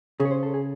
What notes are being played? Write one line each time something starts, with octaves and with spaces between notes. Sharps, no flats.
C#3 G#4
C#5
C5
A4
G#4